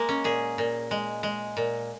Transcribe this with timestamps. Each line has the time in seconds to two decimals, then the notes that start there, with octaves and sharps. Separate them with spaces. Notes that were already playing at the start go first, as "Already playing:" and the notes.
Already playing: G#3 A#3
0.09 C#4
0.24 A#2 G#4
0.58 A#2
0.91 G#3
1.23 G#3
1.57 A#2